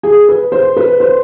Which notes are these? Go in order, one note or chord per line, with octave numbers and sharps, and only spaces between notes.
G#4
B4
C5
B4
C5